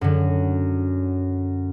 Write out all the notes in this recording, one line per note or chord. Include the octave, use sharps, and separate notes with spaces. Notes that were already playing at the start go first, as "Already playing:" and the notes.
F#2 D3